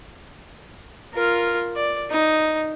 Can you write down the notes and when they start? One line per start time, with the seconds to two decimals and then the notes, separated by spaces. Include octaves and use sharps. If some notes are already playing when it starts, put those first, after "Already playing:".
1.13 F4 A#4
1.76 D5
2.10 D#4